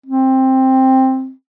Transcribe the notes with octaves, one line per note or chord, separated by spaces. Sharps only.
C4